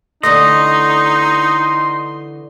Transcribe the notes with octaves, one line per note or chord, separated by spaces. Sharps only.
D3 E3 A3 D#4 D#5 C6